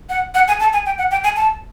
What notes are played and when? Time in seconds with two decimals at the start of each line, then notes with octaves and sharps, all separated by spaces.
0.09 F#5
0.35 F#5
0.48 G#5
0.60 A5
0.73 G#5
0.86 G5
0.98 F#5
1.11 G5
1.24 G#5
1.36 A5